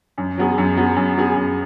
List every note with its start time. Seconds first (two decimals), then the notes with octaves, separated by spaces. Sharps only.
0.18 F#2
0.38 F#3 B3 G#4
0.58 F#2
0.77 F#3 B3 G#4
0.96 F#2
1.16 F#3 B3 G#4
1.36 F#2